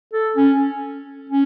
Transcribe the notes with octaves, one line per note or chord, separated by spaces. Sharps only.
A4
C#4
C#4